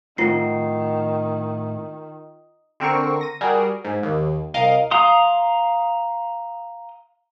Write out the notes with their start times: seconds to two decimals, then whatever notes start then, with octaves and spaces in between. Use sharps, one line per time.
0.18 A2 D#3 C4 F4 F#5 C7
2.80 D3 C4 A#4 C#6
3.21 A#6 D#7
3.41 G3 F#4 G#4 A#4
3.84 G#2
4.03 D#2
4.54 C2 A#4 D#5 F5
4.91 F5 A#5 C6 D#6